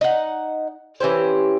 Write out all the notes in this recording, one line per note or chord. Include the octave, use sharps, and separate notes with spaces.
D#4 F#5
E3 C#4 G4 C5